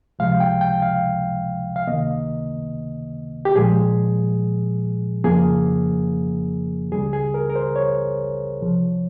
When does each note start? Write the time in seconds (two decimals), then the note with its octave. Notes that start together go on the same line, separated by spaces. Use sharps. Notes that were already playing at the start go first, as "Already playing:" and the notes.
0.19 C#2 C3 F3 G#3 F5
0.40 G5
0.61 G5
0.82 F5
1.76 F5
1.87 C#2 C3 D#3 A#3 D#5
3.45 G4
3.56 A#2 F3 G#3 G#4
5.24 F2 C#3 F3 A#3 G#4
6.92 C#2 C#3 G3 G#4
7.13 G#4
7.34 A#4
7.50 A#4
7.56 C5
7.76 C#5
8.60 C2 C3 F3